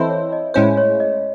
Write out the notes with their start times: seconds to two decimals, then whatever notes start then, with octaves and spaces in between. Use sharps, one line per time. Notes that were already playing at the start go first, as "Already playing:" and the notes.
Already playing: E3 C4 E4 A4 C5 D#5
0.09 C#5
0.33 D#5
0.54 A2 G#3 C#4 E4 C5 C#5
0.77 C#5
1.00 D#5